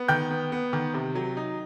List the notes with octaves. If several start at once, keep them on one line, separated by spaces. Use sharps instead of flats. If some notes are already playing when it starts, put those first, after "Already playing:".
Already playing: B3
D#3 G5 G6
B3
B3
D#3
C3
F#3
D#4